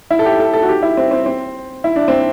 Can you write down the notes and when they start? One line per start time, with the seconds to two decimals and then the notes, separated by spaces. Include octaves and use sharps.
0.10 E4
0.19 A4
0.25 G4
0.40 A4
0.53 A4
0.63 F#4
0.69 G4
0.83 E4
0.97 C4
1.11 C4
1.26 C4
1.84 E4
1.96 D4
2.08 C4